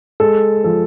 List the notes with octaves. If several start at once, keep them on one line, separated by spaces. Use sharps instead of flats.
G#3 A4
F3 A4